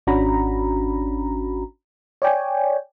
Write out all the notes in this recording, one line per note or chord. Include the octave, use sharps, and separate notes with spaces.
G#1 C#4 D4 F#4 A#5 B5
C#5 D5 G5 G#5